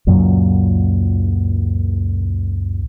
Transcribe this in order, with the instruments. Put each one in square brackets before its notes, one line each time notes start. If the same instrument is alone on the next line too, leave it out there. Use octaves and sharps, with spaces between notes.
[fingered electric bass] C#2 F#2 A#2 F#3